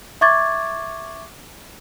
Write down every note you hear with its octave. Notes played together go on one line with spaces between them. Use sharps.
E5 C#6 D6 G#6 A6